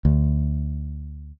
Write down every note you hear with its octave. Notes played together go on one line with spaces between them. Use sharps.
D2